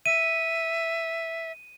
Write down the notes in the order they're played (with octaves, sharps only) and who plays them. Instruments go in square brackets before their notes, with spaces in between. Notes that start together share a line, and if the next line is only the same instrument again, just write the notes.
[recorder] E5 [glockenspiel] D#7